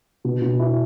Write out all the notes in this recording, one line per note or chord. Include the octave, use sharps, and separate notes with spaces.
B2
B2
E4